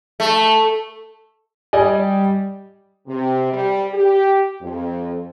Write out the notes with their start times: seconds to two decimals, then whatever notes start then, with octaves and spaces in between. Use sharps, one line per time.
0.20 A3
1.73 G3 D5 D#5 G#5
3.07 C3
3.53 G3
3.94 G4
4.61 F2